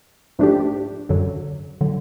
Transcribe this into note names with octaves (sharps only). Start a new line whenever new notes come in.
G#2 F3 A3 D4 G4
F#2 D3 F#3
D3 F#3